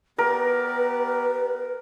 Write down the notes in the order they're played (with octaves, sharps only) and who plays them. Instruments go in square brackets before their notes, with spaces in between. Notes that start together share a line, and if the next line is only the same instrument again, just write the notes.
[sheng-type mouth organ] B3 G4 D5 [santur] A#4 [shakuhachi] B4